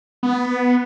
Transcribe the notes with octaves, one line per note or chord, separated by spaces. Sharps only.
B3